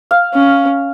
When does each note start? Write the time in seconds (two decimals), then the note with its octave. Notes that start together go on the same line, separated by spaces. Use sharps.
0.11 F5
0.34 C#4